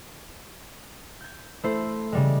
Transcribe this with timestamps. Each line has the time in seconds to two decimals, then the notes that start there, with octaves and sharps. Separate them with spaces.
1.21 G6 G#6
1.64 A3 E4 C5
2.12 C#3 G3 G#3